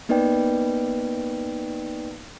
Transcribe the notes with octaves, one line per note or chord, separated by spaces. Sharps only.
A#3 B3 D#4 B4 D5 G5